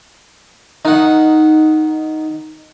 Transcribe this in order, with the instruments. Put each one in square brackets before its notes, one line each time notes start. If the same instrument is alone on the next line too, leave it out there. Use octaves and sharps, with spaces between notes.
[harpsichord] D#3 F#5 [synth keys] D#4